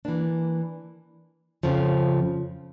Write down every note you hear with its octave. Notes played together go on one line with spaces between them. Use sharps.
E3 A#3 D4
F2 C#3 F3